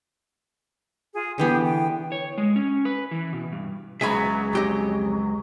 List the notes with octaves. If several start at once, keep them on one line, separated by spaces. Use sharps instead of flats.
F4 G#4
D3 E3 B3 G4 G#4 G5
G5
C#5
G#3
C#4
B4
E3
B2
G2
C#2 F#3 B3 G#4 E5 G#5 B5
F2 G4 D#5